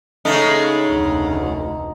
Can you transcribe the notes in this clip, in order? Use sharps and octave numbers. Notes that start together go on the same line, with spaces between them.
C#3 G#3 A3 D#4
F1 D2